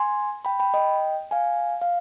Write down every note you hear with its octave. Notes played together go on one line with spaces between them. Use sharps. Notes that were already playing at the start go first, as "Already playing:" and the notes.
Already playing: G#5 C6
G5 B5
G5 B5
D#5 G5
F5 G#5
F5